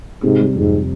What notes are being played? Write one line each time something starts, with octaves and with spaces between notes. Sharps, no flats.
G#2 C3
G3
F2 G#2